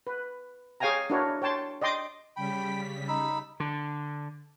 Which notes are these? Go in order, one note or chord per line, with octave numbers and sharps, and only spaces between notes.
B4
G#4 C#5 F5 G5 G#5 A#5
D4 E4 F#4 A#4 C#5
C#5 G5 A5 C6
D5 D#5 G5 C6 D6
C#3 G3 G5 B5 B6
D#4 B5 E6
D3